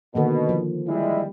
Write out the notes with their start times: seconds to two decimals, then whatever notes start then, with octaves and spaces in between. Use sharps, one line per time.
0.15 B2 D3 D#3 A#3
0.49 F3
0.88 G3 G#3 E4